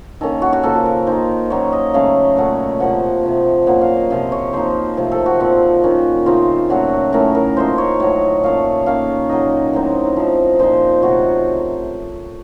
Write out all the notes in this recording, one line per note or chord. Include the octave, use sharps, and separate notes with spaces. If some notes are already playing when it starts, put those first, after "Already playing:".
D#3 A#3 C#4 A4
F#4
F#4
C#3 F3 A#3 A4
A#4
D#3 A#3 D#4 C5
A#2 F#3 A#3 C#4 C#5
D#5
C#3 F#3 A3 C#4 F5
A#2 A3 C#4 F#5
C3 F3 A#3 F#5
C3 F3 A3
A#2 F#3 A#3 C#4 F#5
F5
D#5
C3 F3 C4 F5
C#5
F3 A#3 D#4 C5
C3 F3 A3 C4
A4
F#4
A#2 F3 C4
D#3 A#3 C#4
C#3 A3 C4 D#4 F4
A#2 F#3 A3 C#4 F#4
A2 A3 C#4 A#4
A#4
F3 A#3 D#4 C5
C#5
A2 F#3 A3 C#5
A#2 A3 C#4 F5
D#3 A#3 C#4 F5
A#2 F#3 A#3 D#4 D#5
A2 F#3 C4 D#4
F3 C4 D#4
A#2 F3 C4 D#4 C5
C3 D#3 F#3 A3 F#4